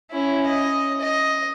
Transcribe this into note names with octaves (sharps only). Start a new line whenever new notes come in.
C#4 E4
D#5
D#5